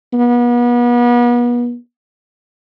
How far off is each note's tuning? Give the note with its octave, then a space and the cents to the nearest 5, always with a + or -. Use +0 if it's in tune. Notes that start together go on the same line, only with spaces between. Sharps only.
B3 -35